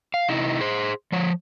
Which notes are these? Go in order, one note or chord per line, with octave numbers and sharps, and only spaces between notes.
F5
C3 D#4 E4
G#4 C5
F3 C#5